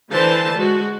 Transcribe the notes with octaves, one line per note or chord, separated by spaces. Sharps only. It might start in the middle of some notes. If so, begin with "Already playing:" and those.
D3 E3 C5 A5
G#3 F#4